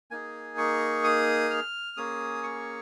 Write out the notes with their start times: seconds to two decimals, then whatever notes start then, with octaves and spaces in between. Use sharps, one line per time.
0.11 A#3 D#4 G#4 G#5
0.58 C#6
1.04 D#6
1.50 F6
1.97 A#3 C#4 G#4 D#6
2.43 C#6